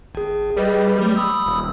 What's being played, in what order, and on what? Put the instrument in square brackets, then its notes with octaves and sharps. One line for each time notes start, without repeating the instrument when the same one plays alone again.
[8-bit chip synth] G#1 G#4
[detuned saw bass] G3 [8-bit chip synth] G#4 B4 D#5
[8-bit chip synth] F#3 A3
B5 D#6 E6
[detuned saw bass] D#1